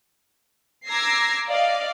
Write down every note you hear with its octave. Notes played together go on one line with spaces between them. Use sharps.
A#5 D6 E6 G#6 A#6 C7
D5 D#5 F5